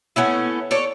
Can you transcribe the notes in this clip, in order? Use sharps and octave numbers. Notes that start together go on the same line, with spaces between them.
A3 B3 C#4 E4
A4 C#5 D5